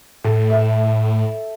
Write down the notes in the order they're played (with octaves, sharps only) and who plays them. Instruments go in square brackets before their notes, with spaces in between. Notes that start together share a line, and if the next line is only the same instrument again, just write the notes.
[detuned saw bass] A2 [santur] A4
[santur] E5 E6